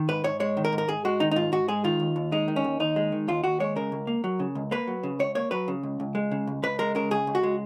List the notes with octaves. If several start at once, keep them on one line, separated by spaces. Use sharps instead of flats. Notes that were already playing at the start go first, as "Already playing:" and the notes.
Already playing: D#3
G#2 B4
G#2 C#5
G#3 C#5
D#3
A#4
G#2
A#4
G#2 G#4
G#3 F#4
D#3 D#4
D#4
G#2 F4
G#2 F#4
G#3 G#4
D#3 F4
D#2
D#2
G#3 D#4
D#3
C#4
D#2
D#2 D#4
G#3
D#3
D#2 F4
D#2 F#4
G#3 C#5
C#3 A#4
C#2
A#3
F#3
C#3
C#2
A#3 B4
F#3
C#3
C#2 C#5
A#3 C#5
F#3 B4
C#3
C#2
C#2
G#3
C#3
C#2
C#2 B4
G#3 A#4
C#3 A#4
C#2 G#4
C#2
F#4
G#3